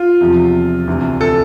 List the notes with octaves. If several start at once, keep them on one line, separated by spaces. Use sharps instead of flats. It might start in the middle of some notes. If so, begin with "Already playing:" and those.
Already playing: F4
E2 C3 F3
D2 C3 E3
A4